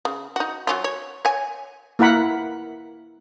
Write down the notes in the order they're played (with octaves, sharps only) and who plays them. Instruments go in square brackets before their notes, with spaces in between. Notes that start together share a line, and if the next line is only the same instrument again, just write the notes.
[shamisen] C#3
D#4 F#4
F#3 C#4 F4
C#5
C#5 G#5
[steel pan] A#3 E4 A#4 F#5 B5